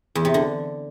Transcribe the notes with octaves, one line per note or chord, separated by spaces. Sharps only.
E2
C3
D3